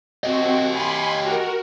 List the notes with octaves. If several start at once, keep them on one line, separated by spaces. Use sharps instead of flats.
C4 F#4 G4 D#5
G#5 B5 C6
F#4 A#4